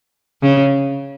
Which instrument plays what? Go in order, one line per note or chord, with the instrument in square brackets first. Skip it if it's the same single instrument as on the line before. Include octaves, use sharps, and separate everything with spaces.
[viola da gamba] C#3